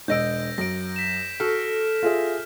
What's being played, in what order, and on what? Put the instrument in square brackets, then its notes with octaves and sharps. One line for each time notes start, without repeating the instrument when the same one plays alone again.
[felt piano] E1 D#5 E6 [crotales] G6 A#6 D7
[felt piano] F#2 [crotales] A#6 D7
[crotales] B6 E7
[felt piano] F#4 [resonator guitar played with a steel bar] A4 [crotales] F6
[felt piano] F4 G#4 E5